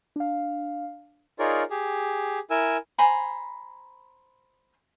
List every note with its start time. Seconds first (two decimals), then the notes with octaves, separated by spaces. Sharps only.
0.16 D4 F5
1.39 D#4 F4 G#4 A#4 C#5 D5
1.70 G4 G#4
2.50 E4 A#4 G#5 E6
2.98 C5 G#5 A#5 B5